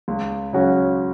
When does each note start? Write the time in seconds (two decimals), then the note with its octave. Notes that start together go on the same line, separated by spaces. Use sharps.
0.08 C#2
0.53 C#3 F#3 C#4 F#4